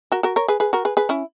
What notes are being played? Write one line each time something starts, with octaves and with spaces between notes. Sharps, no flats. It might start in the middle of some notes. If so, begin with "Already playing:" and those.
F#4 A#4
F#4 A#4
A#4 C#5
G#4 B4
G#4 B4
F#4 A#4
G#4 B4
G#4 B4
C#4 E4